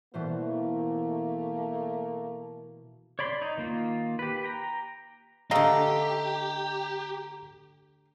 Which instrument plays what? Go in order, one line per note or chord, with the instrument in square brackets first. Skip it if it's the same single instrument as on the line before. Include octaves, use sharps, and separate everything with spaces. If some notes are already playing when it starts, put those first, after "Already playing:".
[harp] B2 E3 C5 [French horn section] A3 A#3
[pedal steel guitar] C#5 D5 B5 C6
D#4
D#3 A#3 F4
G4 B4
G5 A#5
[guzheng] D3 A3 [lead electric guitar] G4 [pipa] D#5 F5 [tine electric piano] A#5